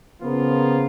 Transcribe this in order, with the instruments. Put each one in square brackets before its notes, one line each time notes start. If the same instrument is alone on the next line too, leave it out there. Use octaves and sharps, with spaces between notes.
[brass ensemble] C#3 F3 A#3 B3 F4